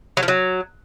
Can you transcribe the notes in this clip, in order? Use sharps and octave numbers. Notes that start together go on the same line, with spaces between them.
F#3
F3
F#3